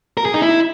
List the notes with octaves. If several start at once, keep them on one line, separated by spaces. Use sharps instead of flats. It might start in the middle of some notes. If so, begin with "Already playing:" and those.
A#4
G#4
D#4
E4